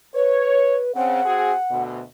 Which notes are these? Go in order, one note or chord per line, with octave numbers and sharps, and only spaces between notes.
B4 C#5
C#3 C4 F#5
C4 F#4 G#4
D2 B2